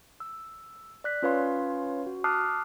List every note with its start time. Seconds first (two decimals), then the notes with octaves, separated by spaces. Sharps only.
0.20 E6
1.04 D5 F#6 B6
1.22 C#4 F4 B4 C#5 F5 C6
2.06 F#4
2.24 A5 D6 D#6 F6 F#6 C7